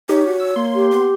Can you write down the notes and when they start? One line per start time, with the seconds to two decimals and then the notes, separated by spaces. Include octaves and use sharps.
0.09 D#4 G4 C#5
0.26 F#4
0.40 E6
0.56 A#3 C6
0.74 G4
0.91 B3